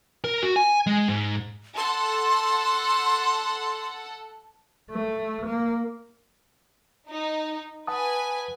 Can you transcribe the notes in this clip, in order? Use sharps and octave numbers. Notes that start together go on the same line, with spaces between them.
A#4
F#4
G#5
G#3
G#2
A4 F#5 C6
A3
A#3
D#4
B4 F#5 G#5 A5 D#6